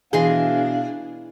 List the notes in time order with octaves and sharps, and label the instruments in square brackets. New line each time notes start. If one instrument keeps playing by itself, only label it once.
[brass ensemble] B2 F5 [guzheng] E3 D#5 C6 [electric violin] D4 [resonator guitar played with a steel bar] G#4